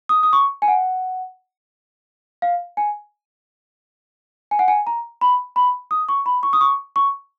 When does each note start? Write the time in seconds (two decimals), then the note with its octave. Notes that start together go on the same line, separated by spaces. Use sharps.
0.09 D#6
0.23 D#6
0.33 C#6
0.62 G#5
0.68 F#5
2.42 F5
2.77 G#5
4.51 G#5
4.59 F#5
4.68 G#5
4.87 A#5
5.21 B5
5.56 B5
5.91 D#6
6.09 C#6
6.26 B5
6.43 C#6
6.53 D#6
6.61 C#6
6.96 C#6